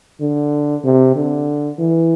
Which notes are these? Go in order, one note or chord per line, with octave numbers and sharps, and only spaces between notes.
D3
C3
D3
E3